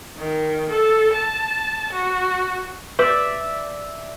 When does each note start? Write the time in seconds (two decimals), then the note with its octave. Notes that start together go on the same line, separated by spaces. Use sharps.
0.17 D#3
0.70 A4
1.13 A5
1.93 F#4
2.99 B4 D5 E5